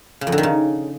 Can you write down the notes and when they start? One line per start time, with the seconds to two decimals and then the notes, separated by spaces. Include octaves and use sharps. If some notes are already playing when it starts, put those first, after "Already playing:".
0.21 C#3
0.27 F2
0.32 D3
0.38 D#3
0.43 C#3